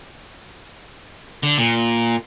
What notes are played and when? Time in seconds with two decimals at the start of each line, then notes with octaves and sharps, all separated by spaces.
1.43 D3
1.58 A#2